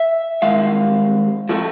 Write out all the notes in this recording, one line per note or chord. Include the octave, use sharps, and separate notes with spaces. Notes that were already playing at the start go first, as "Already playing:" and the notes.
Already playing: E5
G2 D#3 G#3 F5
A2 F3 A3